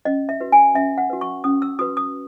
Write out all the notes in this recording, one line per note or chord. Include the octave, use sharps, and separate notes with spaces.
C#4 D#5
E5
F#4 B4
G#5
C#4 E5
F#5
F#4 B4
C#6
C#4 D#6
E6
F#4 B4 D#6
D#6